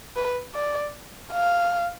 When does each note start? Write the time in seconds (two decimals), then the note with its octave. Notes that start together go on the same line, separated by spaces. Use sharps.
0.16 B4
0.55 D5
1.32 F5